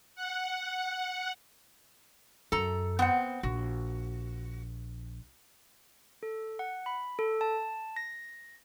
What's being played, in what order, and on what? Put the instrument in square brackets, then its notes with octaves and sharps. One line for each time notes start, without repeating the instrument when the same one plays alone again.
[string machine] F#5
[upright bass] F#2 [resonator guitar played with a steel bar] A4 A#5
[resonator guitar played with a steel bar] B3 C4 F#5
[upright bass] A#1 [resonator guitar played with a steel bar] F#4
[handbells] A4
F#5
B5
A4
A5
A#6